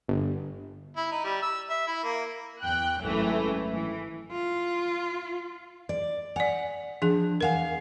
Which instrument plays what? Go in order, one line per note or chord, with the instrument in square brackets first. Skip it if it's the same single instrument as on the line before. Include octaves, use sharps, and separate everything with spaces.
[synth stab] G1
[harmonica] E4
D#4
G3
E6
E5
E4
A#3
[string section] E2 G5 F#6
G#1 F#2 E3 A3
E3
[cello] F4
[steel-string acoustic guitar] D5
[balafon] D5 G#5 [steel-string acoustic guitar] F#5
[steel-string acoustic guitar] F3 [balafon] D4 G#4
[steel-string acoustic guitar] E2 F5 [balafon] A#4 F#5 G#5